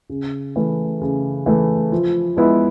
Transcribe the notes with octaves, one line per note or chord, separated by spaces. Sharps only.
C#3
E3 A3
C#3
E3 A3
F3
G#3 B3 E4